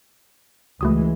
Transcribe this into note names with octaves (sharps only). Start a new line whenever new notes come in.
C#2 E3 G#3 A3 F#4 D#6